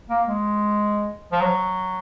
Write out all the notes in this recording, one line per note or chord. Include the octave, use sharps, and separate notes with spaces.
A#3
G#3
F3
F#3